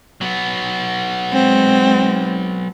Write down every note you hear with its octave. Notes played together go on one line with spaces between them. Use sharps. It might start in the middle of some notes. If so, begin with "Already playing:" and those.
F#3 B3
G#3 C4